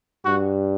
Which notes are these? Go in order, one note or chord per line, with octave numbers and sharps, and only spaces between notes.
G2 F#4